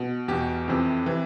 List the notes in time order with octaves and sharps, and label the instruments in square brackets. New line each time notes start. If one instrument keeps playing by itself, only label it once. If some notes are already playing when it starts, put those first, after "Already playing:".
Already playing: [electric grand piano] B2
E2 B2 G4
F2 C3 E3
C3 E3